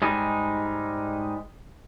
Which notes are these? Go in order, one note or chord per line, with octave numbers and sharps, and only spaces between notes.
G#2 G3 G#3 D#4